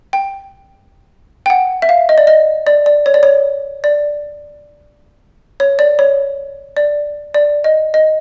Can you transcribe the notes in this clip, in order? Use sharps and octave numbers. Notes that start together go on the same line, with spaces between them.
G5
G5
F#5
E5
F5
D#5
D5
D#5
D5
D5
C#5
D5
C#5
D5
C#5
D5
C#5
D5
D5
D#5
D#5